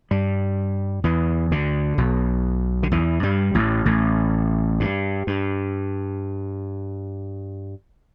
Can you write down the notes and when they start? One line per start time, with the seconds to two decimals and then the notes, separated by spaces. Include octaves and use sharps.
0.11 G2 G3
1.04 E2 E3
1.51 D2 D3
1.98 B1 B2
2.83 D3
2.91 E2 E3
3.23 G2 G3
3.55 A1 A2
3.86 A1 A2
4.80 G2
5.27 G2